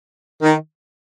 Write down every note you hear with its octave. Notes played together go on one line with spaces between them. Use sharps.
D#3